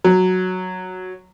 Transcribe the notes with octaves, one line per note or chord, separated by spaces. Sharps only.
F#3